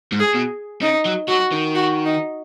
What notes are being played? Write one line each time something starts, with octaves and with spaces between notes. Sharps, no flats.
G#2
G#4
B2
C#3 D#4
F#3
F#3 F#4
D#3
F#4
D#4